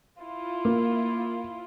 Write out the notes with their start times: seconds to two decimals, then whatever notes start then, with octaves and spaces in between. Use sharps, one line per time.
0.20 E4 F4
0.65 A#3